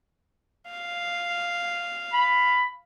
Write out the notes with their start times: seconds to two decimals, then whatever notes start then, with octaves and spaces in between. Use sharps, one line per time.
0.70 F5
2.13 B5